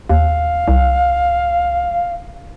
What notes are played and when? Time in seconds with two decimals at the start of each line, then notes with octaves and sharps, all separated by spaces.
0.10 D#2 F5
0.68 C2